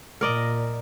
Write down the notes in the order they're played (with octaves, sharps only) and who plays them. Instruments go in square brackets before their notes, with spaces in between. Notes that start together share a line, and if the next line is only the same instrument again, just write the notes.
[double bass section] A#2 [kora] A#4 D5 D#5